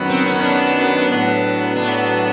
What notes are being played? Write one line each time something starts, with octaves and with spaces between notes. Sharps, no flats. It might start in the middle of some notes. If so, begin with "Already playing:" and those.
Already playing: F#2 D#3 F#3 B3
C4
C#4
D4
A2 F#3 B3
D4